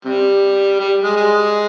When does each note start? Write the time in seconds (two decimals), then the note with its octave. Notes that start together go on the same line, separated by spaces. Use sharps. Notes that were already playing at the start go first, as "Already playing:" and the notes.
0.05 C3 G3
0.79 G3
1.04 G#3
1.16 G#3